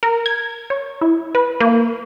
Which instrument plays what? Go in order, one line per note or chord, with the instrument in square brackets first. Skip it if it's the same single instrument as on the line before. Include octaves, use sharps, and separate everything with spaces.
[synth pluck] A#4
G#6
C#5
E4
B4
A#3